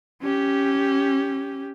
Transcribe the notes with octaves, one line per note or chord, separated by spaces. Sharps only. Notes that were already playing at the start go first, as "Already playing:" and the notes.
C#4 G4